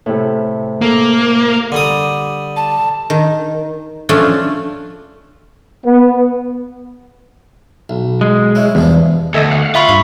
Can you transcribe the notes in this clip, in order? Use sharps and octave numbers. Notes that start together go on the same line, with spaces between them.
A2 C3
A#3 A4
D3 G3 D#6
A5
D#3
F3 A3 C#4 D4
B3
B1
G#3
C#4 E4
E2 G2 C3 F3
D2 A4 D#5 E5
F5 F#5
F4 E5 B5 C#6
G2 C#6